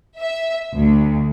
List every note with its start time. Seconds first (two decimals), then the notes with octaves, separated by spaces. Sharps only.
0.18 E5
0.77 D2